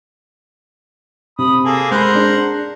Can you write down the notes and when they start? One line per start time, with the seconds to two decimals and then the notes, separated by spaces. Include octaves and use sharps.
1.39 C3 B5 D#6
1.65 A#3 G#4 A4
1.91 G#3 A#4 C5 F#5 B5
2.15 D4 G#4